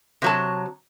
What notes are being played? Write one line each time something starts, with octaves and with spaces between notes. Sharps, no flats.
C3 F#3 A5